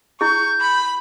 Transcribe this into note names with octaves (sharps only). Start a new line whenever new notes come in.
E4 G#4 C#6 G6
B5